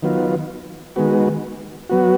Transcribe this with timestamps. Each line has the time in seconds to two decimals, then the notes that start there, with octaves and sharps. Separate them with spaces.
0.03 D#3 F#3 B3 F4
0.96 D#3 G#3 B3 F#4
1.89 F#3 B3 F#4